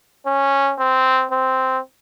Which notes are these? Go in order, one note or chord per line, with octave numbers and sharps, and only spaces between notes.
C#4
C4
C4